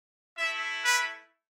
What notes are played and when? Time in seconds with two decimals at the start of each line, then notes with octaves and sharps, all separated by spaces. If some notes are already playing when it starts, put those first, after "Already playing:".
0.38 A3 E4 E5
0.85 B4